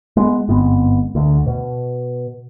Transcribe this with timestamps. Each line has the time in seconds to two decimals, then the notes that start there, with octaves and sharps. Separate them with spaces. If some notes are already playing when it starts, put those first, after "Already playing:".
0.17 G#3 B3
0.49 G1 G#2 B3 C4
1.15 D2
1.46 B2